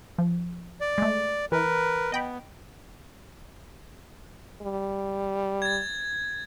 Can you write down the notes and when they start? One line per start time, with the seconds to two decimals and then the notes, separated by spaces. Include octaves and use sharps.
0.18 F3
0.81 D5
0.98 G#3 A3
1.52 E3 A#4 B4
2.12 B3 D#5 G5 B5
4.62 G3
5.62 G#6 A6